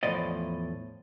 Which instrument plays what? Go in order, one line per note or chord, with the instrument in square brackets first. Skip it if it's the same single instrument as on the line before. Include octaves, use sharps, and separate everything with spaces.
[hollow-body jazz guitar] E2 A2 F3 D5 D#5